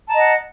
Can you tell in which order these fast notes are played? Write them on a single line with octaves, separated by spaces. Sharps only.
A5 A#5 D#5 F#5